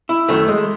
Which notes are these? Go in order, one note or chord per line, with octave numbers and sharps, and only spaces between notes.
E4
F#2 D#3 F#3 A3
G#3